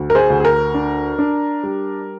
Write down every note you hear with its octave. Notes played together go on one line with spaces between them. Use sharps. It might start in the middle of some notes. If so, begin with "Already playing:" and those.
Already playing: D2
A#4
G#4 C5
D2
G#4
A#4
D4
D4
G3